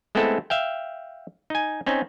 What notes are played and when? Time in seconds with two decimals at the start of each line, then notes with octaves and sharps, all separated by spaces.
0.15 G#3 A3 B3 C4 E4 A4
0.50 E5 F5 G5
1.50 D#4 G#5
1.86 C4 C#4 D#4